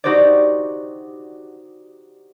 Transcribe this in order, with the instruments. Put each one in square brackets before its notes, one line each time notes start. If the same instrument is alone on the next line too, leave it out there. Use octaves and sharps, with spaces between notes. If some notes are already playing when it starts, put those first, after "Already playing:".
[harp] D#4 F#4 G4 C5 D5